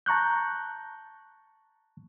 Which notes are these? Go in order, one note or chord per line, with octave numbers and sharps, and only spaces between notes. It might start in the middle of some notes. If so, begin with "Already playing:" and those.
A5 A#5 C#6 F#6 G6